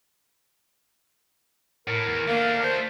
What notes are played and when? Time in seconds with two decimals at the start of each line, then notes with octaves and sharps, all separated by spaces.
1.88 A2 A#4
2.06 E2
2.28 A3 A#3 D4
2.63 C5